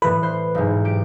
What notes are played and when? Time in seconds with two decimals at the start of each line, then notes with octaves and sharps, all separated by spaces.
0.02 A2 E3 B4 F#6
0.23 C5
0.55 B1 G#2
0.85 G4 D7